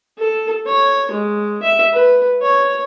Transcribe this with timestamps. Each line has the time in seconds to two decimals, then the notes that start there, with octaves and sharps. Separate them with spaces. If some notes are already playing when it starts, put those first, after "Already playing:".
0.18 A4
0.66 C#5
1.11 G#3
1.63 E5
1.93 B4
2.42 C#5